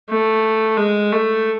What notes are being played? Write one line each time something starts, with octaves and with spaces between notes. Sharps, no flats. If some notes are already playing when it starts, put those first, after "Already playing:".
A3
G#3
A3